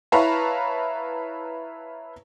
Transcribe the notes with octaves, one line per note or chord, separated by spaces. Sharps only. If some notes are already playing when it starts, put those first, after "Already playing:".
E4 B4 C#5 F5 A5 A#5